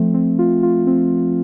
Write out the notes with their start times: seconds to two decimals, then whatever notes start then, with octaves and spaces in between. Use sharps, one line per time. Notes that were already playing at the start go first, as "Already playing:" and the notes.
Already playing: F3 A3 C4
0.14 C4
0.39 F4
0.63 F4
0.87 C4